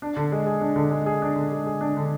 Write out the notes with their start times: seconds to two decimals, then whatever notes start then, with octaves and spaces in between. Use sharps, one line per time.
0.02 D4
0.16 D3
0.32 G#3
0.46 G#4
0.61 D4
0.76 D3
0.91 G#3
1.06 G#4
1.22 D4
1.36 D3
1.52 G#3
1.66 G#4
1.81 D4
1.97 D3